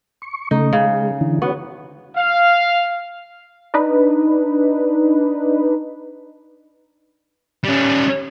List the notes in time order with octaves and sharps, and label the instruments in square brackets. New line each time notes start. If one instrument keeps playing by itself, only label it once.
[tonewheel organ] C#6
[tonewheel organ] C#3 A3 [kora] D#4
[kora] C#3 [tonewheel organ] G#3
[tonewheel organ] D3 E3
[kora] B3 [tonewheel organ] F#4 C#5
[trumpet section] F5
[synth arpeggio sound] D4 D#4 B4
[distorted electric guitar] G3 C#4